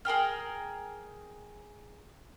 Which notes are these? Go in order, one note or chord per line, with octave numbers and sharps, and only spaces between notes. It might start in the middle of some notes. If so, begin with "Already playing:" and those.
G#4 A#4 G5 F6